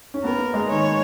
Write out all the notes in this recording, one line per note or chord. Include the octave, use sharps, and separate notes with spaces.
C#4
B3 A#4
A#3
G#3
D#3 C#5